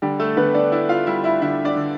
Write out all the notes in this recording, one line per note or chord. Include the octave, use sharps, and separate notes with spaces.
D3 G3 G4
A3 A4
D3 B3 B4
D4 D5
D4 E4 E5
F4 F5
G3 E4 E5
E4 E5
D3 E4 E5
D4 D5
D3